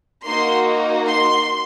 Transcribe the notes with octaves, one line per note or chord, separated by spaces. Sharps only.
A#3 D#4 F#4 C6
C6